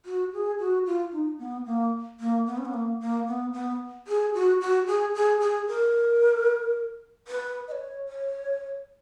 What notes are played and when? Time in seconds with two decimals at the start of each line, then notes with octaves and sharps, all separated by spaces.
0.06 F#4
0.33 G#4
0.60 F#4
0.86 F4
1.12 D#4
1.39 B3
1.66 A#3
2.20 A#3
2.46 B3
2.58 C#4
2.65 B3
2.74 A#3
3.01 A#3
3.27 B3
3.53 B3
4.08 G#4
4.34 F#4
4.61 F#4
4.87 G#4
5.15 G#4
5.40 G#4
5.68 A#4
7.28 B4
7.68 D#5
7.72 C#5
8.08 C#5